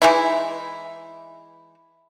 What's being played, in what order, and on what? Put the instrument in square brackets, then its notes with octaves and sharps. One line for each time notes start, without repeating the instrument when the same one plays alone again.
[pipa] E3 G#3 D#4 E4